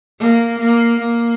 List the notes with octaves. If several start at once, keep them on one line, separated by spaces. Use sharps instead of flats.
A#3
A#3
A#3